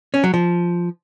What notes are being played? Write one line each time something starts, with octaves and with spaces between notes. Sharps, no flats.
C#4
F#3
F3